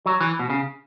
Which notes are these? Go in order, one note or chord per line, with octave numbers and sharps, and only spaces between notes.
F#3
E3
B2
C#3